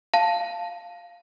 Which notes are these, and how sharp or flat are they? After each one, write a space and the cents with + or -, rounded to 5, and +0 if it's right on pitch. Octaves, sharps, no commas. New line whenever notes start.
F5 -5 A5 +0